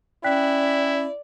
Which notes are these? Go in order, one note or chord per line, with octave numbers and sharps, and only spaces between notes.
C#4 E4 D5 G5 F#6 B6